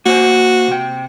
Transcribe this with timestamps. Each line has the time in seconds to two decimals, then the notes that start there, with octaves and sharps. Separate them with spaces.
0.06 A#3 F#4 C5 G#5
0.68 C3 G5